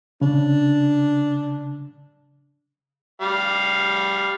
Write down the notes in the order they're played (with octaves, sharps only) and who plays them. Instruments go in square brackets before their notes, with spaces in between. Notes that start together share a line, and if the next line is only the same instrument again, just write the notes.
[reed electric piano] C#3 [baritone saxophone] D4
[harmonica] G3 F5